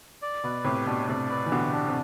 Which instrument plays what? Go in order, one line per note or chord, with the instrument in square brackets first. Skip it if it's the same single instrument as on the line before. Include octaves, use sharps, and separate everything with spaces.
[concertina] D5
[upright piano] B2 [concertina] B4
[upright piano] A2 C3 [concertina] G4
[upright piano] B2 [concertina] D4
[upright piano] A2 C3 [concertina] D5
[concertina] B4
[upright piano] E3
[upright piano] B2 D3 [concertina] G4
[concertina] D4
[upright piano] C3